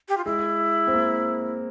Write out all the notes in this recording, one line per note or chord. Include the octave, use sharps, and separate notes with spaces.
G4
F4
G#3 E4
C4
A#3